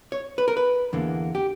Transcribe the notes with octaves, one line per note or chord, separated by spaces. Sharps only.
C#5
B4
A#4
B4
E2 D3 A#3
G4